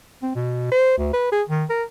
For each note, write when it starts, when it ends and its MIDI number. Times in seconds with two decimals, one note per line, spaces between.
0.23 0.33 60
0.35 0.71 47
0.72 0.97 72
0.98 1.09 38
1.13 1.28 71
1.32 1.43 68
1.49 1.65 51
1.70 1.83 70